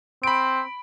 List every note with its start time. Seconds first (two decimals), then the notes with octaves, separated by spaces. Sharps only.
0.23 C4 B5 D7